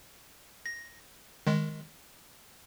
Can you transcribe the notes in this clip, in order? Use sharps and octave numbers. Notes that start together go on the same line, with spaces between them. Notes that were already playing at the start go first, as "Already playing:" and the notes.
A#6
D#3 G#3